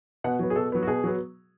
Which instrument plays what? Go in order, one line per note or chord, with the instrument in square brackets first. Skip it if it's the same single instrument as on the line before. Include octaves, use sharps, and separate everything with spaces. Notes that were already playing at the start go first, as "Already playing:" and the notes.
[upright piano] B2 F#5
F#3 B3
G#4
B2 A4
F#3 B3
F#4
B2 G#4
F#3 B3